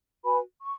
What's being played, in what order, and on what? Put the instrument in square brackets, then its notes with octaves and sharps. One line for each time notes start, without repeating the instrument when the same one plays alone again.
[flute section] F#4 B4 G#5 B5
C#6